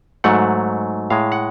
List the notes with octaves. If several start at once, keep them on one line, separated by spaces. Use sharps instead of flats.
G#2 F#3 A3 F#5
A2 G#3 F5
F#5